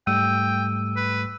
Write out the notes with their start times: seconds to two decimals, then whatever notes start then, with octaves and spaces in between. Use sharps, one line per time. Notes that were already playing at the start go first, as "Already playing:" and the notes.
0.07 G#2 G3 A3 G5 E6 D#7
0.96 B4